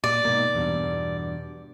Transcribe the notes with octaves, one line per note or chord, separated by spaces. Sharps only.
A#2 D5
G#2 B2 A#3
E2 G2 B2